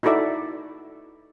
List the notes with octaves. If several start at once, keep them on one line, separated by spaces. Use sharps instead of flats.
D#4 E4 F#4 A4 D5 E5